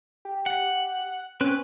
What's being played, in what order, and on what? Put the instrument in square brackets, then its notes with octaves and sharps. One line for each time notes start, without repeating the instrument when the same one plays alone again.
[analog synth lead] G4
[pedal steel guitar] F#5
[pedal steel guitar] C4 B4 F#6 [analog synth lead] C#4